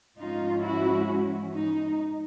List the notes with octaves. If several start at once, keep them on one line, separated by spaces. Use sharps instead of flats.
G#2 F3 G#3 C#4 D#4 F4
E4 F#4
D#4